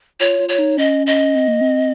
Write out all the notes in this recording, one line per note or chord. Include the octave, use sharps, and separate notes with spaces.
F4 C#5
F4
C#5
D#4
C#4 D#5
D#5
C4
A#3
C4